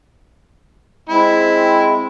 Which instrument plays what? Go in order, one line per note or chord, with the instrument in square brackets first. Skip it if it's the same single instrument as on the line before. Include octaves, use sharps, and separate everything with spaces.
[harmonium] G#3 C4 [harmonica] E4